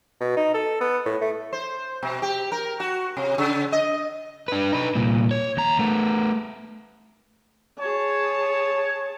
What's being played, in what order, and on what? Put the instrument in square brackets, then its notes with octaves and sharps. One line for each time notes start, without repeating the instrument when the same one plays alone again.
[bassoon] B2
D#4
A4
B3
A2
A3
[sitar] C5
B2
G4
A#4
F#4
C3
C#3
D#5
[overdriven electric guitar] D4 B4
D#4 B4
C2 A#2
C#5
D#2 A#5
A3 B3
[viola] G#4 A5 [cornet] C#5